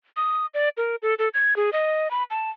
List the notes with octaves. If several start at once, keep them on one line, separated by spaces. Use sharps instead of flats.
D#6
D5
A#4
A4
A4
G#6
G#4
D#5
B5
A5